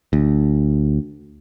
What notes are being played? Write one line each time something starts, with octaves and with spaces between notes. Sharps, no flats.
D2